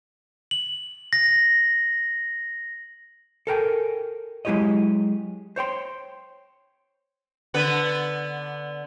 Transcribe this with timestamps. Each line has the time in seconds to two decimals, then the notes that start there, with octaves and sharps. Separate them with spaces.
0.51 F#7
1.13 A#6
3.47 A4 A#4 G5 G#5
4.45 F#3 G#3 E4 G4 C#5 D#5
5.56 C5 C#5 G5 C6
7.54 D3 B3 B4